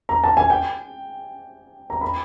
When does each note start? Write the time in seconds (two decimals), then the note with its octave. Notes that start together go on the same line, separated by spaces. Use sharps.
0.09 A#5
0.24 A5
0.37 G#5
0.50 G5
1.90 A#5
2.01 B5